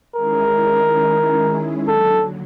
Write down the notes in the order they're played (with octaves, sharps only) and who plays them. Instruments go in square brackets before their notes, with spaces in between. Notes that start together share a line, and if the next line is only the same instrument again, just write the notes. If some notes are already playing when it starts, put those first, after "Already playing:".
[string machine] D#3 G#3 C#4 E4 G#4 [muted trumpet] A#4
[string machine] D#2 D3 F#3 [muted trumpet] A4